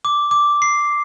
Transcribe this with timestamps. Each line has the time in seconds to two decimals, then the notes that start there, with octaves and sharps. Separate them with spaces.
0.05 D6
0.31 D6
0.62 C7